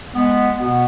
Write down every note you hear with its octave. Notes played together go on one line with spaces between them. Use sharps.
G#3 B3
B2 B3